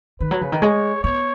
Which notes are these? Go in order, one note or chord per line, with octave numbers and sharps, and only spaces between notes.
D#3 B4
F#3
C#3
D#3
G#3 C#5
B3 C#5